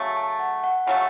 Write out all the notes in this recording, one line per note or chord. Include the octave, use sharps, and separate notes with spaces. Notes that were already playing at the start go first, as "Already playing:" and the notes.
Already playing: C#3 F#3 A3
A5
F#5
F#5
C#3 F#3 A3 F#5